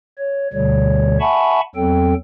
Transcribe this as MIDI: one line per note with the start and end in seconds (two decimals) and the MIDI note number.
0.18 0.48 73
0.53 1.18 38
0.53 1.18 47
0.53 1.18 50
0.53 1.18 55
0.53 1.18 73
1.20 1.61 76
1.20 1.61 78
1.20 1.61 80
1.20 1.61 81
1.20 1.61 83
1.20 1.61 85
1.76 2.14 40
1.76 2.14 54
1.76 2.14 60
1.76 2.14 69
1.76 2.14 79